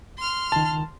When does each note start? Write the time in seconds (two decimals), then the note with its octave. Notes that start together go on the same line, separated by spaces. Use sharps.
0.18 C6 F6
0.52 C#2 D#3 A5